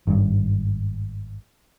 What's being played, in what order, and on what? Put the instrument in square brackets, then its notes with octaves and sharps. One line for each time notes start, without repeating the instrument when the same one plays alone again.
[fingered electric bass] G#1 G2